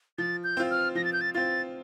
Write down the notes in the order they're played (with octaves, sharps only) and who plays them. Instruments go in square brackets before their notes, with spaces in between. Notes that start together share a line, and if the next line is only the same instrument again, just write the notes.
[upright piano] F3 [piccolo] A6
[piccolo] G6
[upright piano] C4 F4
[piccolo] F6
[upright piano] F3 [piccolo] A#6
[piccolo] A6
G6
A6
[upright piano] C4 F4 [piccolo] A6